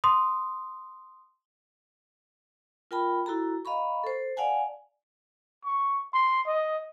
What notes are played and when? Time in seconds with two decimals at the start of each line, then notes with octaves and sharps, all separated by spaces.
0.04 C6 D#6
2.91 F4 A#4 G5 A5 B5
3.26 E4 F#4 A4 A#5
3.65 D#5 F5 A#5 B5 C#6
4.04 A4 C5
4.37 D5 F5 F#5 G#5 A5
5.65 C#6
6.13 C6
6.47 D#5